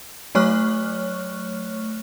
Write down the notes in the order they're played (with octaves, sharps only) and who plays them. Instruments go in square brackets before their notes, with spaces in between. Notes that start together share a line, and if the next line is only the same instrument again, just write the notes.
[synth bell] F#3 A3 C#5 C#6 F6 F#6